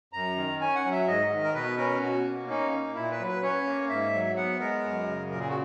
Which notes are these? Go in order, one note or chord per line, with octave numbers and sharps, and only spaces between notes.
F#2 A#5
D#3
C#4 G#5
F#5
F#3
E5
G#2 D#5
D#3
A#4
B2 B4
C#4 A#4
B2 F#4
A#3
C#4 D#4
A#3
A#2 E4
B4
F#3
B4
C#4 C#5
A#3
G#2 E5
F#3
B3 F#5
G#3 A#4
F#2
C#3
A#2 A#4
G#4
F#4